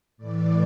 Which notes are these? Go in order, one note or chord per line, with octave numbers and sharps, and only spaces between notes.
A2 E3 D5